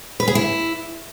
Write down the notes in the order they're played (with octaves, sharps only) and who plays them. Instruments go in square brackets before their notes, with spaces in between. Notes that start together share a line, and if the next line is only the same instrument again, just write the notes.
[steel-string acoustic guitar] B4
G#4
E4